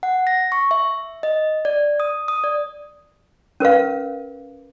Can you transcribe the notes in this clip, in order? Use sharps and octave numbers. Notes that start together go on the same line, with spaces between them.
F#5
A#6
C#6
E5
D#5
D5
D#6
D#6
D5
C#4 A#4 B4 F5